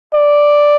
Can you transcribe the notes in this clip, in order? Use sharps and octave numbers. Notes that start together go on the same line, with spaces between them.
D5